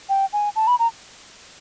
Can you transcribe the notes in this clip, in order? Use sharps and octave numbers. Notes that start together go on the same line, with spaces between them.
G5
G#5
A5
B5
A#5